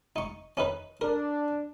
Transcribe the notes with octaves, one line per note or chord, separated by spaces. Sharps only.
D#4 C#6
C#4 D#4 B4
D4 A#4